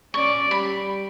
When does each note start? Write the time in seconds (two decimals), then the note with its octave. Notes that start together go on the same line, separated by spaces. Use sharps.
0.14 C#4 D5 C#6
0.51 G3 B5